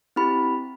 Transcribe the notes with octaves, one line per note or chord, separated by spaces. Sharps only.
C4 E4 G4 B5